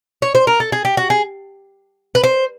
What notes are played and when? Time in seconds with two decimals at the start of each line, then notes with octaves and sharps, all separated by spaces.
0.22 C#5
0.35 C5
0.47 A#4
0.60 A4
0.72 G#4
0.85 G4
0.97 F#4
1.10 G#4
2.15 B4
2.23 C5